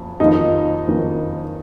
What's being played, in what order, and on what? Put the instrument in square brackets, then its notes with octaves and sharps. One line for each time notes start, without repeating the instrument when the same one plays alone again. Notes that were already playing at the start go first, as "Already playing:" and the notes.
Already playing: [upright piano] F#1 F2
[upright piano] F#1 F2 D#3 A#3 F4 [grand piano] D#4
[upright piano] F#1 F2 D#3 A#3 F4